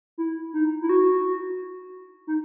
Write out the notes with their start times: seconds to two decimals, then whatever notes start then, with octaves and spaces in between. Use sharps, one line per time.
0.18 E4
0.53 D#4
0.82 E4
0.89 F#4
2.27 D#4